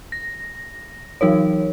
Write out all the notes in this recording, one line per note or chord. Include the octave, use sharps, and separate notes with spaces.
A#6
E3 F#3 D#4 A#4 C#5